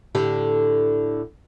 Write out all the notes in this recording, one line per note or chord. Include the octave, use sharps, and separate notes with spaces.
A2 D3 G4